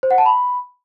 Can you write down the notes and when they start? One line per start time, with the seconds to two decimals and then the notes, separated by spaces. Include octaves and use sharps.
0.03 C5
0.11 F#5
0.18 A5
0.26 B5